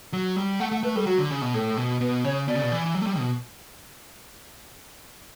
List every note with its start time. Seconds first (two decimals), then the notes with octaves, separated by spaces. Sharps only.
0.13 F#3
0.36 G3
0.60 A3 F#5
0.71 A3 F#5
0.83 A3 B4
0.95 G3 A4
1.06 F#3 F#4
1.19 D3
1.31 C#3
1.42 B2
1.54 A2 A4
1.77 B2
2.01 B2 B4
2.24 C#3 C#5
2.48 B2 D5
2.55 C#3
2.63 B2
2.72 E3
2.86 E3
2.95 F#3
3.01 A3
3.07 G3
3.18 B2